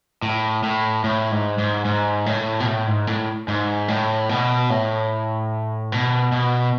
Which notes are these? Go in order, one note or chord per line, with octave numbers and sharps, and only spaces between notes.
A2
A2
A2
G#2
G#2
G#2
A2
B2
A2
G#2
A2
G#2
A2
B2
A2
B2
B2